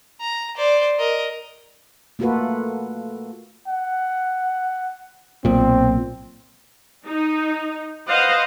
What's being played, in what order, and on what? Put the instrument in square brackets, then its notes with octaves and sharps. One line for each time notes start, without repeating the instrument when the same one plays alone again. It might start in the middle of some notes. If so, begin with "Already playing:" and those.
[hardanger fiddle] A#5
C5 D5
A#4 D#5
[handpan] A3 A#3 F4 F#4 A4 B4
[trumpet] F#5
[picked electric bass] B1 A#2 [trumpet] C4
[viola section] D#4
B4 C5 D#5 F5 F#5